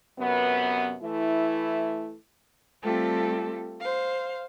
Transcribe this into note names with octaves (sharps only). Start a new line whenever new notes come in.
F#2 C3 B3
E3 A3 E4
G3 A3 C4 F4 G4 A4
C5 F5